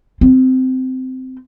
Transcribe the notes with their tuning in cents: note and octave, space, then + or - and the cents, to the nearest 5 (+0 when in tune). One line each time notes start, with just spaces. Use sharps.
C4 -15